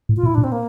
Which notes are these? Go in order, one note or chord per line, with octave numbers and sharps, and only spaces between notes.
A2
F4
A#2
E4
A#2 D4
C4
A#3